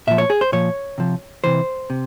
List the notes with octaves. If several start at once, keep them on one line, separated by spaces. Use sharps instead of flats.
A#2 F3 E5
C#5
G#4
C5
A#2 F3 C#5
C3 F3
C3 E3 C5
C3